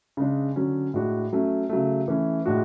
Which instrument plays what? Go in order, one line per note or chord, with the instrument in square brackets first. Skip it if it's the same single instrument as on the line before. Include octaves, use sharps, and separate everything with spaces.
[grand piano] C#3 G#3 D4
D3 F#3 C#4
A2 G#3 D4 F#4
F#3 A3 C#4
C#3 F#3 A3
E3 A3 C#4
A2 G#3 D4 F#4